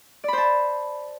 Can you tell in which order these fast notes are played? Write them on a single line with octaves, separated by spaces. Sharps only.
D5 B5 C5 A5